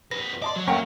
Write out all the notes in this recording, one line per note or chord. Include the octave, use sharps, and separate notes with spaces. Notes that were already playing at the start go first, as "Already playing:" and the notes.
F2 B4 A#6
D5 D#5 A5 C6
F#3
A3 A#3 C#4 F#5 G5 A#5